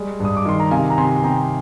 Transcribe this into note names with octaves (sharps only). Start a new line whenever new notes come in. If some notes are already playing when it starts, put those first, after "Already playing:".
Already playing: G3 G#3
G2 D#6
D6
D#3 C6
A#5
C3 F5 G#5
A#5
C3 G#5 C6
C6
C3 G5 A#5